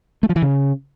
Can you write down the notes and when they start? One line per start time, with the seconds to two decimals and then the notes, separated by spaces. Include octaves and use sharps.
0.23 A3
0.29 F3
0.36 E3
0.42 C#3